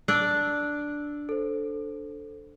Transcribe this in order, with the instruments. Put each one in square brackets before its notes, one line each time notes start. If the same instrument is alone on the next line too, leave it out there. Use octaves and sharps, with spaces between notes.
[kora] D4 D5 [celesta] E6
[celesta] A4 C5